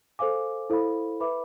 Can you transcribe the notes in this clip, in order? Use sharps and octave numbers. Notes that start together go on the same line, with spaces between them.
A4 C5 F5 G#5 D6
E4 A4 C5 F5 B5
B4 E5 B5 D6